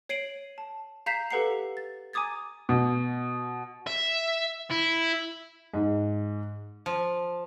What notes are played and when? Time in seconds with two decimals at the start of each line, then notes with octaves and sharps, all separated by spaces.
0.09 C#5 C7 D7 D#7 F#7
0.58 A5
1.06 F5 A#5 G6 B6 C7 E7
1.30 G4 A4 B4 F#5 A#5 C7
1.77 A6
2.13 G#5 A#5 D6 D#6 G#6 A6
2.69 B2
3.87 E5
4.71 E4
5.74 G#2
6.86 F3